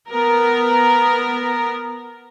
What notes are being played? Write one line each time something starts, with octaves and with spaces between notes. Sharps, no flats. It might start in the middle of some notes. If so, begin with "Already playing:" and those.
B3 A#4